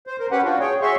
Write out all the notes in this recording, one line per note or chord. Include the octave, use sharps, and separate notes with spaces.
C5
A#4 C5
C#4 G4 B4 F#5
D4 F4 F#4
G#4 C#5 G5
F#4 G#4 C#5 E5 C6 C#6